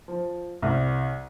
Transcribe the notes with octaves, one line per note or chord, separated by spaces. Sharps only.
F3
C2